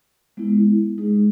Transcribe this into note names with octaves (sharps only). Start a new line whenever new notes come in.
G#3 B3 E4
G#3 D#4 G#4